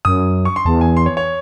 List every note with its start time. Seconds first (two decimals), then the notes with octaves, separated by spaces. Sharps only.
0.05 F#2 D#6
0.45 C#6
0.56 C6
0.65 E2 A5
0.81 G#5
0.97 C6
1.06 C#5
1.17 C#5